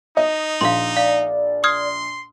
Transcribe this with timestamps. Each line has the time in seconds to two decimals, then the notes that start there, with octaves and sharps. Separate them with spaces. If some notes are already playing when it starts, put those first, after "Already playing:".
0.17 D#4 D#5
0.61 A#1 F5 C6
0.96 D5 F5
1.64 C6 D#6 F6 G#6